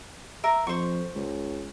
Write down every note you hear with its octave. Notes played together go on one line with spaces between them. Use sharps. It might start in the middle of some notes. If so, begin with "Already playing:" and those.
A#4 E5
F2 C5 C#6
C#2